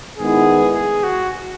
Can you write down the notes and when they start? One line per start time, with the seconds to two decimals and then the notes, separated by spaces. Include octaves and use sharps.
0.18 D#3 G#3 B3 E4 G#4
0.75 G#4
1.03 F#4